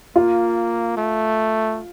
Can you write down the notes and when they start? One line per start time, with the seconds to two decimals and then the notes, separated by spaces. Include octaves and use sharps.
0.16 A#3 F4
0.97 A3